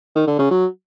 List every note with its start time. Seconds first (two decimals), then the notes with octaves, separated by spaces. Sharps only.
0.15 D#3
0.27 D3
0.39 C#3
0.51 F#3